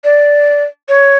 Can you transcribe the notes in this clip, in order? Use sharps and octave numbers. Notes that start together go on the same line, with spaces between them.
D5
C#5